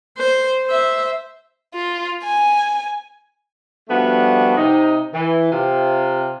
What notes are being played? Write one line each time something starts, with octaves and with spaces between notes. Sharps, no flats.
C5
C5 E5
F4
G#5
F3 G3 A3 B3 D4 F#4
C3 D#4
E3
C3 F4